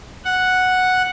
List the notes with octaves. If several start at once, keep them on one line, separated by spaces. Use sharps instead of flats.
F#5